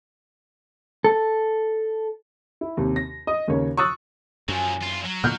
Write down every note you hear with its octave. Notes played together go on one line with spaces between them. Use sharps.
A4
E4
D#2 C3
A#6
D#5 D#6
D#2 C#3 A#4 C#5
C#6 D#6 E6 F#6 A6
F#2 F3 F#3 C#4 A#4 G#5
E2 F4
F#3 F5
A#2 D3 B3 D#4 F#5 B5 F6 G6